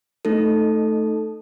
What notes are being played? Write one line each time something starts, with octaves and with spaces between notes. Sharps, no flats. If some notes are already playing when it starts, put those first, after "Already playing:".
A3 D#4 A4